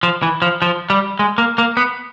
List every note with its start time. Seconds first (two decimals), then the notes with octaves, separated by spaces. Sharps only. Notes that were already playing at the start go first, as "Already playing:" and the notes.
0.03 F3
0.23 E3
0.42 F3
0.62 F3
0.90 G3
1.19 G#3
1.38 A#3
1.58 A#3
1.77 B3